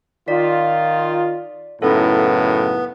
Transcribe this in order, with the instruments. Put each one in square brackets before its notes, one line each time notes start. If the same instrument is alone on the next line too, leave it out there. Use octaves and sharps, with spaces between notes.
[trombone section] D#3 F4 [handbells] D5 B6
[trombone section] F#2 A2 C#3 [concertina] B3 [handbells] D#4 E4 A4